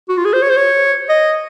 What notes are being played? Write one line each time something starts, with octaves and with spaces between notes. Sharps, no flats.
F#4
F4
G#4
C5
C#5
C5
C#5
D#5